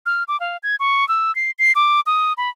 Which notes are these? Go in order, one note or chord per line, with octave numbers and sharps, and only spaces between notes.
F6
D6
F5
G#6
C#6
E6
C7
C7
D6
D#6
B5